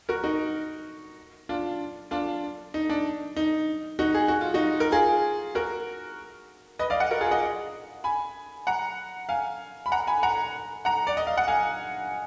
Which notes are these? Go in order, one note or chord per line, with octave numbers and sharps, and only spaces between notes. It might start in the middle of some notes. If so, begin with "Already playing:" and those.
F#4 A#4
D#4 F#4
D4 F4
D4 F4
D#4
D4
D#4
D#4 F#4
G#4
F#4
F4
D#4 F#4
A#4
F4 G#4
F#4 A#4
B4 D#5
D5 F5
D#5 F#5
F#4 A#4
F4 G#4
D#5 F#5
G#5 B5
F#5 A#5
F5 G#5
B5
F#5 A#5
G#5 B5
F#5 A#5
F#5 A#5
D5
D#5
F5
F#5
F5 G#5